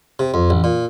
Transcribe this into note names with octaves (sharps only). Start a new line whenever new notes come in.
C3
F2
A1
A#2